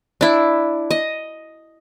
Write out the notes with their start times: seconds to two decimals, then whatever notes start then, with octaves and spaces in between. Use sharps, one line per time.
0.21 D4 E4
0.91 D#5